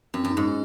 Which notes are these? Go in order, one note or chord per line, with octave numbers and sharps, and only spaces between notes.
F#2 C4
F#2 C#4
D#4
G#2
C#4